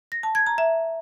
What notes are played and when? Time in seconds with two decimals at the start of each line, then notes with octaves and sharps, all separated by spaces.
0.12 A#6
0.23 A5
0.35 G#6
0.46 A#5
0.58 E5